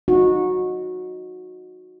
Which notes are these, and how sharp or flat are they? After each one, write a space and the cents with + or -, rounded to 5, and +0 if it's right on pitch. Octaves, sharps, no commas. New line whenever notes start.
D#4 +0 F#4 -15